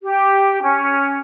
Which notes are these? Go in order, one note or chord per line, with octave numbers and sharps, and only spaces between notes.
G4
C#4